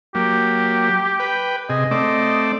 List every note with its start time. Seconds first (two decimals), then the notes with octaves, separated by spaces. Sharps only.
0.15 F#3 A#3 G4
1.20 B4 G5
1.69 C3 G#4 D#5
1.91 A3 C4 D5